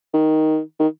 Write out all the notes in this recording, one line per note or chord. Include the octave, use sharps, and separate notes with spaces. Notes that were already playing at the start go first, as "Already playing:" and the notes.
D#3
D#3